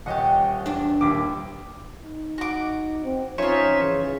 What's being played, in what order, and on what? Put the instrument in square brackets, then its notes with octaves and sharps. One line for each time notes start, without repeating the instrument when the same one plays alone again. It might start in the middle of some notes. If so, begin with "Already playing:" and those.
[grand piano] D#1 D#5 [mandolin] G4 C#5 F#5
[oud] E2 D4
[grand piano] D#1 D#2 D6
[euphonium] D#4
[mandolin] F#4 D6
[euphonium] C4
[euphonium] F3 [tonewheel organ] C#4 D#4 E5 [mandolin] F4 C#5
[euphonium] C#3 [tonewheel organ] E3